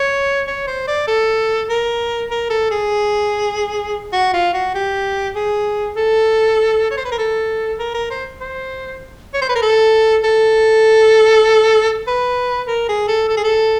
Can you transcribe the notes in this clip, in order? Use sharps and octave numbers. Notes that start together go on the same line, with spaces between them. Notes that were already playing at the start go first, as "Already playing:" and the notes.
Already playing: C#5
C#5
C5
D5
A4
A#4
A#4
A4
G#4
F#4
F4
F#4
G4
G#4
A4
C#5
C5
B4
A#4
A4
A#4
A#4
C5
C5
C#5
C5
B4
A#4
A4
A4
B4
A#4
G#4
A4
A4
G#4
A4